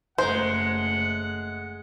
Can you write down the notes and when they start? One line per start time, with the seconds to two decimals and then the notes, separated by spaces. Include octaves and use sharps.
0.18 F#1 G#3 A3 C5 F#5